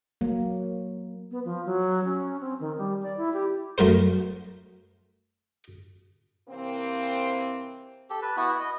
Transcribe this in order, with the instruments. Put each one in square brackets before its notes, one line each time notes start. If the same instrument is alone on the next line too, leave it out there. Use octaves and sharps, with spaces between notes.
[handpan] F#3 A#3
[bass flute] B3
F3
F#3
C#4
C4
D#3
G3
D5
E4
G4
[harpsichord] F#2 A3 A#4 C5
[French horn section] C3 E3 A#3 C4
[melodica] G4 A4
B4 A5
B3 E4 F#4
D#5